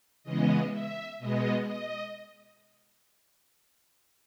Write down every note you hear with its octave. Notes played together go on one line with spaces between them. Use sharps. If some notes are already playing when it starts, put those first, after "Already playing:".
C#3 E3 G#3 B3 D#5
E5
B2 G#3 B3 D#5
D#5